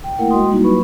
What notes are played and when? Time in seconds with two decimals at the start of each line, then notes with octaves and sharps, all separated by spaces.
0.04 G5
0.18 A3 A#3 E4 A#4 F#5 G5
0.30 G#3 F#4 D#5 G5 C6 D#6
0.50 G3 A#3 D#4 E4 F#4
0.64 F#3 A#3 F4 B4 B5 C#6